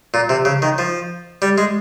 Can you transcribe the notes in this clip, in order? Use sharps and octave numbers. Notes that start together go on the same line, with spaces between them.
A#2
C3
C#3
D#3
F3
G3
G#3